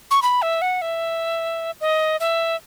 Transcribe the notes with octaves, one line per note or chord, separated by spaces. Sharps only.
C#6
B5
E5
F#5
E5
D#5
E5